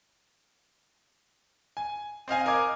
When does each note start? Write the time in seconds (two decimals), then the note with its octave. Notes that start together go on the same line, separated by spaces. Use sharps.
1.77 G#5
2.28 C4 D#5 F5 G#5
2.46 A#4 D#5 G#5 D6 G#6